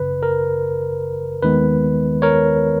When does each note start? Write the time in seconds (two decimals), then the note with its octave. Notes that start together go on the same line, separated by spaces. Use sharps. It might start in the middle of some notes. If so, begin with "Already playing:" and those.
Already playing: G#1 F#2 C#3 B4
0.23 A#4
1.42 D#2 D#3 G#3 B3 B4
2.22 A#4 C#5